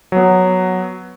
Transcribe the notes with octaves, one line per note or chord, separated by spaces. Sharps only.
F#3 B3